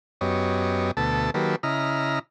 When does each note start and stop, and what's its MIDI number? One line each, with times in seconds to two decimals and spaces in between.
0.21 0.91 42
0.21 0.91 59
0.21 0.91 67
0.21 0.91 73
0.21 0.91 75
0.97 1.30 38
0.97 1.30 47
0.97 1.30 57
0.97 1.30 69
0.97 1.30 81
1.34 1.56 51
1.34 1.56 54
1.34 1.56 58
1.34 1.56 67
1.34 1.56 69
1.34 1.56 71
1.63 2.19 49
1.63 2.19 64
1.63 2.19 75
1.63 2.19 82
1.63 2.19 89